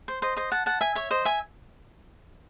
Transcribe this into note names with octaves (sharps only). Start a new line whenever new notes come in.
C5
C5 D#5
C5 D#5
F#5 A5
F#5 A5
E5 G#5
C#5 E5
C5 D#5
E5 G#5